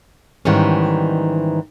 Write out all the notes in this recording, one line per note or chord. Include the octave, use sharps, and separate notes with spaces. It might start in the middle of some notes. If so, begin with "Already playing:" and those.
G#2 D#3 E3 G3 C#4